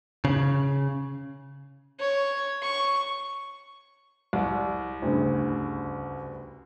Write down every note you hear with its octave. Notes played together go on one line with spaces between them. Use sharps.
C#3
C#5
C#6
C2 D5
D2 G2 C#3